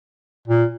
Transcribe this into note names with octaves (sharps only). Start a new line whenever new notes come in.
A#2